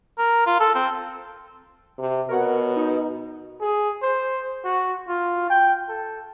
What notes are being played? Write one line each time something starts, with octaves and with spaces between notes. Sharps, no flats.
A#4
F4
A4
C4
C3
B2 A#4 C#5 F#5
D#4
G#4
C5
F#4
F4
G5
A4